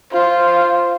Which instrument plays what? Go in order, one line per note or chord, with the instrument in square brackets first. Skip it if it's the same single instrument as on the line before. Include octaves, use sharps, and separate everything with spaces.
[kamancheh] F4 [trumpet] C5